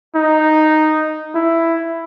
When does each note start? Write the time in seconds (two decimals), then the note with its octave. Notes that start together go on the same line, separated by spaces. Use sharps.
0.15 D#4
1.35 E4